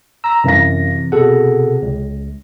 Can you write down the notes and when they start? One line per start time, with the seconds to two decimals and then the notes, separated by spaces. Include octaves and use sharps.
0.24 A#5 E6 A#6
0.44 F#2 C3 E3 F5 A#6
1.12 B2 G#4 A4 F#5
1.82 C#2